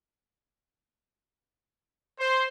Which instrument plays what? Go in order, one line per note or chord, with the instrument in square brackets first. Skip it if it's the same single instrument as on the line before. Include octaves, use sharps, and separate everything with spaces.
[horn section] C5